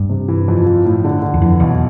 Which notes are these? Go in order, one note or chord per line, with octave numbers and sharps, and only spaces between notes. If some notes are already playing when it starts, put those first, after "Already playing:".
Already playing: G2
C3
E3
F2
F3
A2
D3
D3
E2
F2 E3
B1 E2